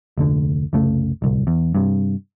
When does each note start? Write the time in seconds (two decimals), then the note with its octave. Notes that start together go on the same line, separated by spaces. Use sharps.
0.18 F1 D2 D3
0.73 F#1 C2 C#3 A3
1.22 D1 C2
1.47 E2
1.75 G2 C3